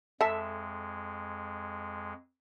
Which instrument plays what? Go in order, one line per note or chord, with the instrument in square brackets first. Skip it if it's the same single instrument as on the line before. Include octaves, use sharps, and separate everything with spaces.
[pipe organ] F2 G#3 [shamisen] A4 A5 [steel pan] E5